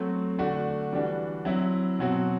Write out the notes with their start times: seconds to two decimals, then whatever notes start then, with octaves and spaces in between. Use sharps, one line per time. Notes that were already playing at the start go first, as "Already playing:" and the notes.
Already playing: F#3 A3 C4 F#4
0.38 D3 A3 D4 F#4
0.92 E3 G3 D4 F#4
1.45 F#3 C4 E4
1.99 B2 F#3 C4 F#4